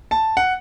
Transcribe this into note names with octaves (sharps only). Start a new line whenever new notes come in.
A5
F#5